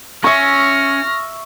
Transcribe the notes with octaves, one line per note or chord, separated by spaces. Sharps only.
C#4 E5 C#6 F6 A#6